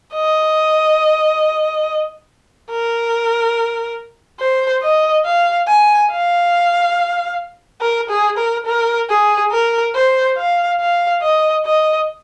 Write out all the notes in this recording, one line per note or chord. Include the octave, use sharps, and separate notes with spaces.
D#5
A#4
C5
D#5
F5
G#5
F5
A#4
G#4
A#4
A#4
G#4
A#4
C5
F5
F5
D#5
D#5